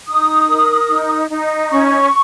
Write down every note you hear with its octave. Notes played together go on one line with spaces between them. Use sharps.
D#4 D#6
A#4
D#4
D#4
C#4 C#6